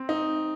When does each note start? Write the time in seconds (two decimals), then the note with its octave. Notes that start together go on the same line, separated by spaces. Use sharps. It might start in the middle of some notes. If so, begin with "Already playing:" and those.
Already playing: C4
0.09 D#4